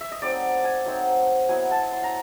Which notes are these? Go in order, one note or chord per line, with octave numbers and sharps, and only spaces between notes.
E5
D#5
F#3 A3 C4 D#4 D5
G#5
F#3 A3 C4 D#4
F#3 B3 E4 G#5
A5
C6
A#5